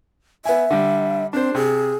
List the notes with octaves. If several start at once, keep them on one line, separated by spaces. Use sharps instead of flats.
B3 E5 G#5
D3 G3
C4 D4 C5
C3 G#4